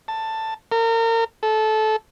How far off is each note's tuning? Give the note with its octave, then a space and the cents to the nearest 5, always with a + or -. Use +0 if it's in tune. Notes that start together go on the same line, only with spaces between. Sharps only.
A5 +10
A#4 -35
A4 -20